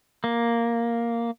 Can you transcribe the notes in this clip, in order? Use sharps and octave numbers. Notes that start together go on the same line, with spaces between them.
A#3